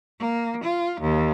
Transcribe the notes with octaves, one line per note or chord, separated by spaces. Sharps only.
A#3
F4
D#2